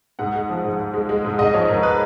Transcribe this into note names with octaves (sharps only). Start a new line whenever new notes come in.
G#2 F#5
G#3
F3
G#2
G#2
G#3
G#3
G#2
G#2 D#5
F3 C#5
G#2 A#4
B4